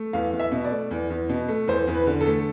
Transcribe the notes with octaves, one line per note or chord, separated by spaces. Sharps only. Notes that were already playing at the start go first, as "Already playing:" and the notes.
Already playing: A3
E2 F5
E2
E5
B2
D5
A3
E2
E2
B2
A3
E2 C5
E2
B4
D3
A4
A3